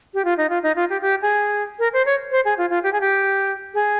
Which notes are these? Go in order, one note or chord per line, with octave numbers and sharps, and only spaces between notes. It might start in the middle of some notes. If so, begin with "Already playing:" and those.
G4
F4
D#4
F4
D#4
F4
G4
G4
G#4
A#4
C5
C#5
C5
G#4
F4
F4
G4
G#4
G4
G#4